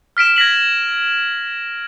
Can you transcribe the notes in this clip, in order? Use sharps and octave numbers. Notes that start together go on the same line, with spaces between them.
F6 B6 D7 E7
G#6 A#6 B6 F#7